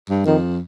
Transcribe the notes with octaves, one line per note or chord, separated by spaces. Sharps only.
G2
F2 D#3